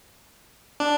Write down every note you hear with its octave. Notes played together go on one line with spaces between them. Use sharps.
D4